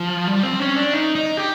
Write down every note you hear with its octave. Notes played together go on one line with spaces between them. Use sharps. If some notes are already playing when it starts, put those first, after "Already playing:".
Already playing: F3
G3
C4
C#4
D4
D#4
D#4
G4